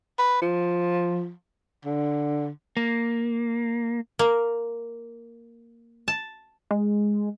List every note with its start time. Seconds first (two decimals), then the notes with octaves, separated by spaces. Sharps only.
0.19 B4
0.42 F3
1.85 D3
2.77 A#3
4.19 A#3
6.08 A5
6.71 G#3